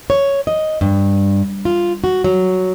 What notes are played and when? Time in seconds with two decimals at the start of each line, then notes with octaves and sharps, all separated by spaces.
0.10 C#5
0.47 D#5
0.81 G2
1.65 F4
2.04 F#4
2.24 F#3